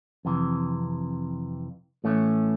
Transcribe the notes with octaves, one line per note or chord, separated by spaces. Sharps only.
F2 C3 E3
A2 E3 A3 C#4